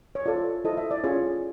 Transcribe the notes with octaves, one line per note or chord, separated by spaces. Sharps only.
C#5
F4 A4 C5 D5
E4 A4 C5 D#5
E5
D5
C#4 F4 G#4 C#5